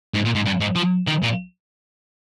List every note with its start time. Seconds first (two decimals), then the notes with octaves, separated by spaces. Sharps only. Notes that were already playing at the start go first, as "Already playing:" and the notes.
0.14 G#2
0.25 A#2
0.35 G#2
0.46 G2
0.61 G#2
0.76 F3
1.07 D#3
1.23 A#2